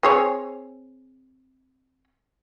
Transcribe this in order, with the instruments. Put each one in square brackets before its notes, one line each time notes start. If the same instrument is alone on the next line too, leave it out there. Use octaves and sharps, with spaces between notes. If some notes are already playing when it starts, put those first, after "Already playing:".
[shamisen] C4 G#4 C#5